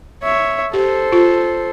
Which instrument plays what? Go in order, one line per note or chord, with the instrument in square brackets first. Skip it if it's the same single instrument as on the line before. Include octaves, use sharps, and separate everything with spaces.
[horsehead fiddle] C#5 E5
[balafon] G4 [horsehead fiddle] A4 C5
[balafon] F4